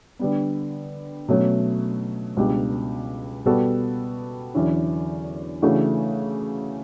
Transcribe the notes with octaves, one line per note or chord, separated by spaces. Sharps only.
D3 G3 B3
B2 F#3 A3 C#4
C#2 B2 G3 D4 G4
B2 G3 B3 F#4 A4
E2 D3 F#3 C#4 E4
C#3 E3 A3 D4 F#4